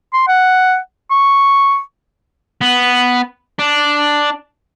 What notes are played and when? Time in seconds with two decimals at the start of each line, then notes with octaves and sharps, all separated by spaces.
0.13 C6
0.28 F#5
1.11 C#6
2.61 B3
3.59 D4